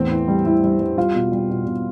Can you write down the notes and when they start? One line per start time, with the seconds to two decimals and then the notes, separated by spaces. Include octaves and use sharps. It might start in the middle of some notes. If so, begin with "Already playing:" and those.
Already playing: E2 A2 C4
0.11 E3
0.28 G3
0.45 G3 E4
0.63 G3
0.80 G3
0.97 G3 F4
1.14 B2
1.32 G3
1.49 B2
1.66 B2